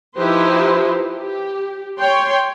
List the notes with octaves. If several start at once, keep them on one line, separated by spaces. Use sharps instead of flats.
F3 D#4 E4 G4 B4 C5
G4
C#5 G5 C6